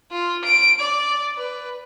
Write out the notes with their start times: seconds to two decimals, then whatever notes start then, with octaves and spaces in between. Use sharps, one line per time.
0.11 F4
0.44 D7
0.79 D5
1.37 B4